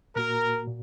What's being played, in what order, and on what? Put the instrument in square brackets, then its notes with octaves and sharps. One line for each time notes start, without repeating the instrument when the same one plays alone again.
[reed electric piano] A#2 A#3 F#4 [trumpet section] A#4
[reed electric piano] A#2